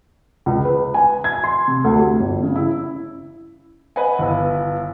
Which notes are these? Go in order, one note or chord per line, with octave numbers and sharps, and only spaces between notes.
C#2
B4
G#5
G#6
C6
C3
D2
G4
G1
C#3
E4
B4 D#5 F#5 G#5
G1 E4